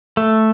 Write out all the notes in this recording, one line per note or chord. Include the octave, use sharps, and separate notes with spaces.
A3